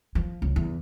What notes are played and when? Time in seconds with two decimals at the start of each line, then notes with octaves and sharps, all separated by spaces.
0.15 F3
0.42 C#2
0.56 E2